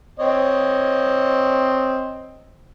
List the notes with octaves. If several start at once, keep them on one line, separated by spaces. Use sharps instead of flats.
C4 C#5 D#5